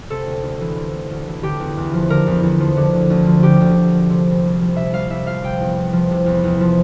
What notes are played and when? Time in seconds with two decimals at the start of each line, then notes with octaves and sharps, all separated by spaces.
0.10 C3 A4
0.27 D2
0.43 D2
0.60 E3
0.77 C3
0.93 D2
1.10 D2
1.27 E3
1.43 D3 G4
1.60 E2
1.77 E2
1.94 F3
2.10 D3 A#4
2.27 E2
2.43 E2
2.60 F3
2.77 D3
2.93 D2
3.10 D2
3.26 F3
3.43 D3 G4
3.60 D2
3.77 D2
3.93 F3
4.10 C3
4.26 C2
4.43 C2
4.60 F3
4.76 C3 E5
4.93 C2 F5
5.10 C2 E5
5.27 F3 F5
5.43 C3 G5
5.60 E2
5.77 E2
5.93 F3
6.11 C3
6.26 E2
6.44 E2
6.60 F3